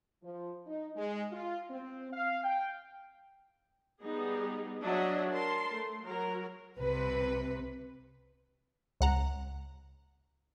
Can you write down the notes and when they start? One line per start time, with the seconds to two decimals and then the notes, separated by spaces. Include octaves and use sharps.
0.23 F3
0.67 D#4
0.96 G#3
1.31 F4
1.71 C4
2.13 F5
2.44 G5
4.00 G3 B3 D#4 G#4
4.82 F#3 D4 F#4 D#5 E5
5.30 A#4 A5 C6
5.70 A3
6.04 F#3 F#4 A#4
6.79 C2 C3 B4
9.01 C#2 F#5 A#5